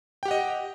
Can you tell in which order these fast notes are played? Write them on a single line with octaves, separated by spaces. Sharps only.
G5 G4 F#5 D#5